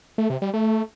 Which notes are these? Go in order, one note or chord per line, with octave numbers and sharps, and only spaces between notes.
A3
C3
G3
A3